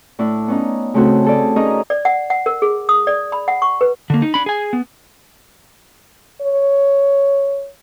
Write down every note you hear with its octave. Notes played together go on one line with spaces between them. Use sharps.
A2 D4 E4
B3 C#4 D#4
C#3 A3 C4 C#4 F#4 A4
G#4 A4 D5
C#4 D#4 G#4 A#4 D#5
D5
F#5
F#5
A#4
G#4
D#6
D5
B5
F#5
C#6
B4
D3 A#3
D#4
D4 B5
G#4 G#5
B3
C#5